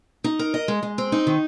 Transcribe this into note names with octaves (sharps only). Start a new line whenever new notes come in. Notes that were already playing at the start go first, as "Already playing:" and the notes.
D#4
A#4
D#5
G#3
G#3
C4
D#4
D#3